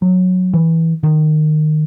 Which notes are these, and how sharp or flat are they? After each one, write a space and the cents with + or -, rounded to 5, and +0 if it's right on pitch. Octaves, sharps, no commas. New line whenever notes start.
F#3 -15
E3 -15
D#3 -20